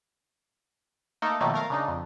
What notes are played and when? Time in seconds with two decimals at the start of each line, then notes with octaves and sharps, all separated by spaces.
1.22 A3 A#3 D#4 A4 A#4
1.40 B2 D#3 F3 F#3 A3 A#3
1.54 A3 A#4 F5
1.70 C#3 D4 D#4
1.88 F2